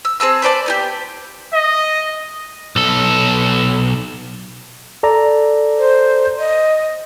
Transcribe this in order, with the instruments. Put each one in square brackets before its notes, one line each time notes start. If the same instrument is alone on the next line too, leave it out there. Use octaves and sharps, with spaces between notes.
[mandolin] E6
C4 G#4 A5 E6
B4 C5 D5 A5
B3 D#4 G4
[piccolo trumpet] D#5
[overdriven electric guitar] B1 A4
[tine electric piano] A4 D5 A#5
[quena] C5
D#5